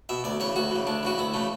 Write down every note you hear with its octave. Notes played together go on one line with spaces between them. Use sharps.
B2 E5
D2 D5
C#3 E3 C#5
D2 F#4
C#3 E3
D2 D4
C#3 E3 F#4
D2 E4
C#3 E3 A3